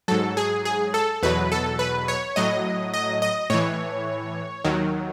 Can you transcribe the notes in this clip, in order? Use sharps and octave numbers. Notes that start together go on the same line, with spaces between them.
G#2 F#3 A4
G#4
G#4
A4
E2 B2 F#3 B4
A4
B4
C#5
A2 F#3 D#5
D#5
D#5
A2 E3 C#5
D#2 D#3 F#3